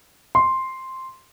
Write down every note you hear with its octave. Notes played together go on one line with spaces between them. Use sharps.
C6